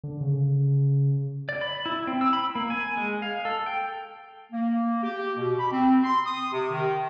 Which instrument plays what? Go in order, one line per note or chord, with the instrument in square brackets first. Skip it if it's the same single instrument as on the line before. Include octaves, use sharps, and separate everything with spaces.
[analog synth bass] D3
C#3
[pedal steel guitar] D5
B5
E4
C4
E6
B5
A#3
G#5
G#3
F5
A4
G5
[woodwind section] A#3
G4
B2
B5
C4
C6
D#6
C3
D#3